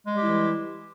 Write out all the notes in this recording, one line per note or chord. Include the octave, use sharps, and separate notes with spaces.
E3 G3 G#3 E4 G4